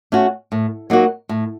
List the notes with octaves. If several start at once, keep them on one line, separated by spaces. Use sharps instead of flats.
A3 C#4 F#4
A2
F#3 A#3 D#4 F#4
A2